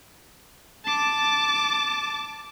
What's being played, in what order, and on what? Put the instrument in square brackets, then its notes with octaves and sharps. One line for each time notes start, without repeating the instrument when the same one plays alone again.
[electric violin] A5 D6